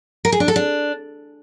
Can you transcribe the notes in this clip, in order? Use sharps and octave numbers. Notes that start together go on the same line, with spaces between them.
A#4
G#4
D4
A4
D4